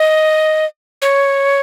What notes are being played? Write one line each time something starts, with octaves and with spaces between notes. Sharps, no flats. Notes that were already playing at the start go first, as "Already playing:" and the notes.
Already playing: D#5
C#5